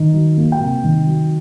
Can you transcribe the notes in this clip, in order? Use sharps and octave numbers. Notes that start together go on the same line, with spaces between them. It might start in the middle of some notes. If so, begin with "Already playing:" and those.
Already playing: D#3
F#3
A#3
G5
C3
D#3
F#3